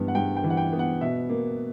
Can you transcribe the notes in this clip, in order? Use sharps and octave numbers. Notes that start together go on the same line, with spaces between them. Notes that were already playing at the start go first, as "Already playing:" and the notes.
Already playing: G2 E3 B3
F#5
G2 G5
G5
E3
F#5
G5
B3
F#5
B2 E5
A#3